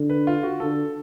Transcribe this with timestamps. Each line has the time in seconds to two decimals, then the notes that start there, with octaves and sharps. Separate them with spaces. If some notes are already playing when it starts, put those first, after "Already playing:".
Already playing: D3
0.09 B4
0.27 F4
0.43 F#4
0.60 D3 A4